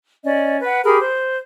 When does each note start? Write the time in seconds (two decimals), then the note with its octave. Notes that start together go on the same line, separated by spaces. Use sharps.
0.25 C#4 D5 D#5
0.62 B4 F#5
0.85 G4 G#4 A#4 B5
1.01 C5